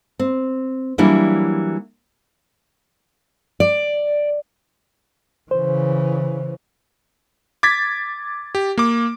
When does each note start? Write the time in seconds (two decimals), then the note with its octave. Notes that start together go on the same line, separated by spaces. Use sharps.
0.19 C4
0.98 E3 F#3 G3 A#3 D4 E4
3.60 D5
5.51 C#3 E3 C5
7.63 D6 G#6 A6 B6
8.55 G4
8.78 A#3 D6